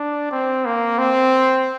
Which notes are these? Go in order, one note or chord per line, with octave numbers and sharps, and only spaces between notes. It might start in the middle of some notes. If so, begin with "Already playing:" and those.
Already playing: D4
C4
A#3
C4